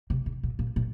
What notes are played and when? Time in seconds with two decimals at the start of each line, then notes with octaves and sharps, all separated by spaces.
0.10 C3
0.26 G#2
0.43 A#2
0.59 A#2
0.76 A#2